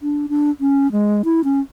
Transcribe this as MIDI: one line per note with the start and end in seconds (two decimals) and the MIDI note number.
0.01 0.27 62
0.29 0.50 62
0.61 0.91 61
0.92 1.22 56
1.25 1.41 64
1.44 1.60 61